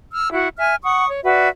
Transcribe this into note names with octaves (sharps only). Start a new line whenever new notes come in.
E6 F6
E4 F#4
E5 G#5 F6
F#5 C#6 D#6
C#5
F#4 B4 D5 E5